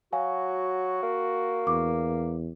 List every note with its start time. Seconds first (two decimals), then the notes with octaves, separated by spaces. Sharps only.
0.13 F#3 F#4 F5 G#5
1.03 A#3
1.67 E2 D6